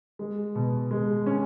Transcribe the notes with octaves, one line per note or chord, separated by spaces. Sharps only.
G#3
B2
G#3
C#4